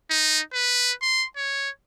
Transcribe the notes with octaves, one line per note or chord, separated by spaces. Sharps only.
D#4
B4
C6
C#5